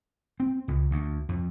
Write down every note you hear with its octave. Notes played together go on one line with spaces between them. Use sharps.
C4
C#2
D2
F2